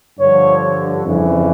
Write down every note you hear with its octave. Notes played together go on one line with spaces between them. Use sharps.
G2 D3 F3 C#5
F2 C#3 E3